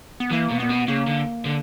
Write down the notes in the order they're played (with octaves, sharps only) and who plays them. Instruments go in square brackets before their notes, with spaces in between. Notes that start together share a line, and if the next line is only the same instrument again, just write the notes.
[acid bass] B3
[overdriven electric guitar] E3 [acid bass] A#3
[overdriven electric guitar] B2
[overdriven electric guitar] A#2 [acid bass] B3
[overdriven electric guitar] B2
[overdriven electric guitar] C#3 [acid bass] A#3
[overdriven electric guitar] D3
D3